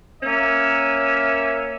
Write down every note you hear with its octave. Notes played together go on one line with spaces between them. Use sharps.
A#3 C#4 E5